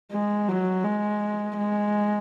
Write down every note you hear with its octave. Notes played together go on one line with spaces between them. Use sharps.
G#3
F#3
G#3
G#3